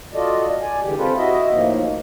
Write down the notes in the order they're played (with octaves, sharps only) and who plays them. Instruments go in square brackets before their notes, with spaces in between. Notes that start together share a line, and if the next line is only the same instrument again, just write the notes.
[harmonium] F4 F#4 A4 D5 D#5
D5 G#5
D3 E3 G#3 G4
C4 F4 G4 A4 B4
E4 F#4 D#5 E5
A2 D#3 F3 A#3